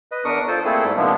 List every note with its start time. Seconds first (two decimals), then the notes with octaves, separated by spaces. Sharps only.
0.12 B4 D#5
0.25 E2 D4 A#4 C#6 D#6
0.48 F4 A4 C5
0.65 A3 A#3 C4 E4 G#4 A4
0.84 G#2 G3
0.97 C3 F3 G#3 A#3 B3 D4